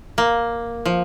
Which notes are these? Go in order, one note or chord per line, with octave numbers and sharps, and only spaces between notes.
A#3
F3